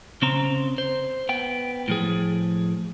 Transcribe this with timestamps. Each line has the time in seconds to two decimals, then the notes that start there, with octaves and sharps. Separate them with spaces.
0.22 C#3 C4 A#5
0.78 C5
1.29 B3 G5
1.88 A2 F3 G#4